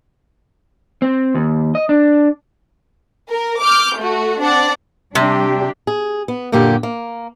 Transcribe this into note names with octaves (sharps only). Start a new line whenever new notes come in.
C4
D#2
D#5
D4
A#4
D6 F6 G6
A3 F#4
C4 D4 D5 F#5
C3 G3 D4 G4
G#4
B3
F#2 A#2 D3 A#3 G4
A#3